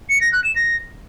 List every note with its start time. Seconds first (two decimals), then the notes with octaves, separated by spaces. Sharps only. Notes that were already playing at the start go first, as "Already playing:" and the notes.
0.10 C#7
0.21 A#6
0.33 F#6
0.44 E7
0.56 A#6